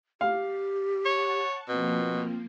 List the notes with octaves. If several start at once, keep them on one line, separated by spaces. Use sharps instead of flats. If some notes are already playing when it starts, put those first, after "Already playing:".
G4 F5
C#5 F#5 A5 C#6
B2 F3 A#3 C4